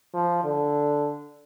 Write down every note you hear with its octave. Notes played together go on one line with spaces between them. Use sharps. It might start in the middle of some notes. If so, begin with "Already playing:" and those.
F3
D3